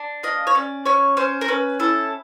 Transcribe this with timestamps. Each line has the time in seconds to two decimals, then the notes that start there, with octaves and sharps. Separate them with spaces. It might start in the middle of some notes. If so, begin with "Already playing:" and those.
Already playing: D4
0.23 A#3 D#5
0.47 C#5
0.55 C#4 D5
0.85 C#4 C#5
1.17 C#4 C5
1.41 A#4
1.48 C#4 B4
1.80 E4 A4